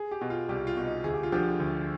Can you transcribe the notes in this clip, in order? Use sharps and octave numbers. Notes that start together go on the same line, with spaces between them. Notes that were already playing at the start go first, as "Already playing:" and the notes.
Already playing: G#4
G4
B2
F4
C2 G4
F4
B2
D#4
D2 G#4
G4
F4
D3 F3 G4
D2